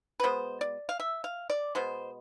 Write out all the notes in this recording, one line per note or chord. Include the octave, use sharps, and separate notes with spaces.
B4
B2 G#3 B3 C5
D5
F5
E5
F5
D5
B2 G#3 B3 C5